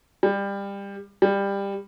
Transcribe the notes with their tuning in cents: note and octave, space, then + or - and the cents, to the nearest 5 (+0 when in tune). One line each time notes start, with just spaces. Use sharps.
G3 +25
G3 +20